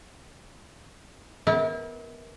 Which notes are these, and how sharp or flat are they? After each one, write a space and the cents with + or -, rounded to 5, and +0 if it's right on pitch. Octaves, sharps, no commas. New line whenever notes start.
B3 +0 E4 -35 A#4 +0